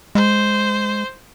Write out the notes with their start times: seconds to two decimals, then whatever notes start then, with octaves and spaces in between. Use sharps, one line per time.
0.15 G#3 C5